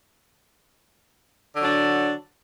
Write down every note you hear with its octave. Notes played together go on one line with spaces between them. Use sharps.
D3 F#3 D4